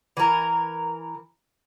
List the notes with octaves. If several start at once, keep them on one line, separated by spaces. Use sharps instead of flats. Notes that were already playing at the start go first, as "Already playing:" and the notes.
E3 A#4